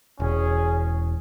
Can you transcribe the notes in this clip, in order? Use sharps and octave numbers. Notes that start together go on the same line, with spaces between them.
E1 C#4 G#4